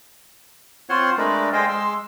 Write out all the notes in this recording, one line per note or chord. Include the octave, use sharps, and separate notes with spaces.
C4 F4 C5 C#5 F#5 C6
G#3 A3 D4 A#4 B4 D5
G#3 G#4 C5 D#5 F5 G5
G#3 C6 E6